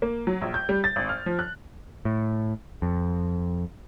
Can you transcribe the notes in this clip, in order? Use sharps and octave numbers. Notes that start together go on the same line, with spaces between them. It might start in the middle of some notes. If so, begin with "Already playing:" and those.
A#3
F#3
A#1
G6
G3
A6
G#1
F6
F3
F#6
A2
F2